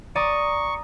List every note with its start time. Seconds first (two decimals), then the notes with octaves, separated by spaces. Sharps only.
0.15 D5 A#5 C#6 D#6